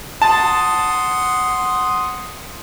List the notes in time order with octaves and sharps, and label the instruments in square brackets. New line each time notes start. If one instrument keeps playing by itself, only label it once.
[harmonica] F#5 C6 D#6 [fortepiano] A5